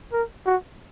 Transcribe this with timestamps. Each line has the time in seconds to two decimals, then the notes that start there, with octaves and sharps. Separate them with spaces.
0.12 A#4
0.46 F#4